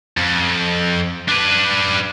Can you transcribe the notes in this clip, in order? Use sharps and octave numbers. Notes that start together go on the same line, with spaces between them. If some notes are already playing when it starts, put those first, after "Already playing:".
F2
D4 B4